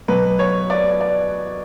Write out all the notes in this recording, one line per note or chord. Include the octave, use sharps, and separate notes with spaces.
B2 F#3 B4
C#5
D5
D5